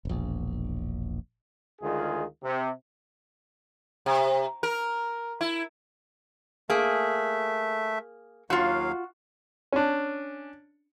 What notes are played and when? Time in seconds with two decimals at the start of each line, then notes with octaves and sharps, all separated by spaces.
0.05 E1 A#1
1.81 D2 D#3 G#3 F4 G#4
2.44 C3
4.06 C3
4.63 A#4
5.41 E4
6.70 A3 A#3 G#4 E5
8.50 D#2 F#3 F4 F#4 F5
9.72 C#4 D4